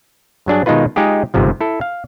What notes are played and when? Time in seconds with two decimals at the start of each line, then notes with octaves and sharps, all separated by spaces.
0.46 G2 F#3 D4 G#4
0.66 B2 D#3 G#3 D#4 F4 B4
0.96 G#3 D#4 F4 G4 G#4
1.34 G1 G#2 C3 F3
1.61 E4 A4
1.81 F5